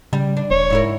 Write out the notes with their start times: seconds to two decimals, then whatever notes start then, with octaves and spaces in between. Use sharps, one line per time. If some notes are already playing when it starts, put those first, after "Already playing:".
0.13 C#3 G3
0.37 D4
0.51 D#1 C#5
0.70 G#2 E4 A#4